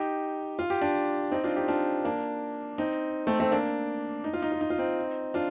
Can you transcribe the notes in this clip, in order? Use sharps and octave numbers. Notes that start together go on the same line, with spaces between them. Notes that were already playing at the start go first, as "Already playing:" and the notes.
Already playing: D#4 G4
F4
G4
D4 F4
C4 D#4
D4 F4
D#4 G4
D4 F4
A#3 D4
C4 D#4
A3 C4
A3 C4
A#3 D4
D#4
F4
D#4
F4
D#4
F4
C4 D#4
D4 F4